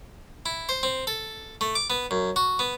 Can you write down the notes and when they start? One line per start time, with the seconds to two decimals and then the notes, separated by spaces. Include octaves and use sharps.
0.46 E4
0.69 C5
0.83 C4
1.07 A4
1.61 A3
1.75 D6
1.90 B3
2.11 F#2
2.36 F#4
2.59 B3